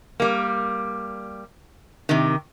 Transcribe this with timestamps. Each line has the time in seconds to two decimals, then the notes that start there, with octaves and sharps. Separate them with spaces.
0.20 G3 A#3
2.09 C3 D#3